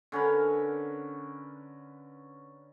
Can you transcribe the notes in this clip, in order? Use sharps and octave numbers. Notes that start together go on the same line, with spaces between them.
D3 C#4 A#4 B4